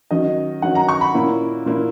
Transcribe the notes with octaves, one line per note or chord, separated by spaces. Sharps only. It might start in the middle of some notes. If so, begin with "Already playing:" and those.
D#3 F#3 C#4 D#5
D#3 F#3 C#4 F#5
A#5
C#6
B5
A#2 A#3 C#4 E4
A#2 A#3 C#4 E4